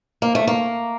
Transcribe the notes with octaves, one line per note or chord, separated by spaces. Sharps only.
A#3
A3
A#3